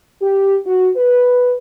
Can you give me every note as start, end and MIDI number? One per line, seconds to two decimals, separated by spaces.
0.21 0.56 67
0.66 0.88 66
0.96 1.55 71